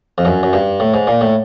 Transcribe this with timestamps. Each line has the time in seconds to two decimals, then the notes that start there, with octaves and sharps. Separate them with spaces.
0.18 F2
0.25 F#2
0.43 F#2
0.53 G2
0.80 A2
0.94 G#2
1.07 A#2
1.21 A2